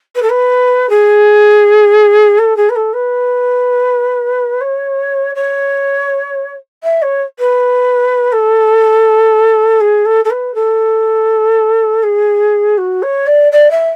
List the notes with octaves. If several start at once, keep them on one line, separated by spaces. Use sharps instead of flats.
B4
A4
B4
G#4
A4
G#4
B4
A4
B4
C#5
C#5
E5
C#5
B4
A4
G#4
A4
A4
B4
A4
G#4
F#4
C#5
D5
D5
E5